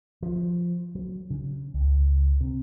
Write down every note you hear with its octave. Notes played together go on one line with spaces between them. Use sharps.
F3
F#3
C#3
C#2
C3